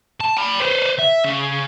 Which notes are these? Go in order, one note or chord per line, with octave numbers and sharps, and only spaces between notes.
A5
G5 B5
B4 C5
E5
C#3